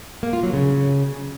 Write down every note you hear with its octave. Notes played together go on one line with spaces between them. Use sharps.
A#3
F4
F#3
C#3